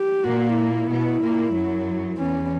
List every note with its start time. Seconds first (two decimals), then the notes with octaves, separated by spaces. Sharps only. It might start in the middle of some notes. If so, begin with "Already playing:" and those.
Already playing: G4
0.24 A#2 A#3 F#4
0.56 E4
0.88 B2 B3
1.21 A#2 A#3
1.53 F#2 F#3
2.18 E2 E3 C#4